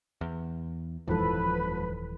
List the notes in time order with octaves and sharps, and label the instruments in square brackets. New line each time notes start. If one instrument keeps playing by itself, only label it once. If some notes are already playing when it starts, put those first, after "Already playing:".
[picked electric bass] E2
[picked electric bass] D#1 [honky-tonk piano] F2 G#2 [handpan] E3 A4 [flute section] B4